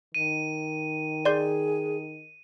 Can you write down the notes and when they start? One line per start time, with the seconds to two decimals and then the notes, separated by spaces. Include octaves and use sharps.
0.15 D#3 D#7
1.25 G#4 D5 C6 G6